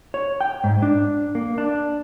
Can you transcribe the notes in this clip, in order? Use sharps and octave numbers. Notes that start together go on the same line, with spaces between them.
C#5
G5
G#2
D4
A#3
D4